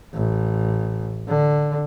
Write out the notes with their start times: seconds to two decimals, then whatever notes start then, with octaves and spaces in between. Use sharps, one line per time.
0.14 A1
1.28 D3